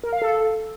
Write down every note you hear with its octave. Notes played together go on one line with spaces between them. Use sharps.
A#4
F5
A4